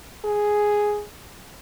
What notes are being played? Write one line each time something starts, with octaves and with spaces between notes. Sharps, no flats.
G#4